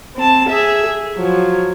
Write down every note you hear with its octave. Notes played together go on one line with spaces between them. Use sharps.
C4 A5
G#4 E5
G#4
F3 F#3